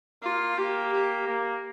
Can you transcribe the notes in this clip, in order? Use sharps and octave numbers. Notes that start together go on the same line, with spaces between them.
A#3 F4
A#3 G4
G4
A#3